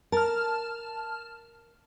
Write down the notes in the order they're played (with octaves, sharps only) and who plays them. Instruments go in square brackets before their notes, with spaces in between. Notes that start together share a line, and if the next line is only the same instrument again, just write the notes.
[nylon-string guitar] A#4 [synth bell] A5 F6